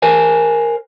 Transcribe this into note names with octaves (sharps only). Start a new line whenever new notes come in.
A#4 C5 G#5